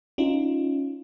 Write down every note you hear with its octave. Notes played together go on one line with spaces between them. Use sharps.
C#4 D#4 F4